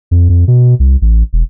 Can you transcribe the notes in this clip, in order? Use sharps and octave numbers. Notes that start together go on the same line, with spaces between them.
F2
F2
B2
C2
A1
E1